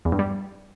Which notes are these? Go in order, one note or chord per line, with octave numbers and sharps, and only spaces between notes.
E2
G2
G3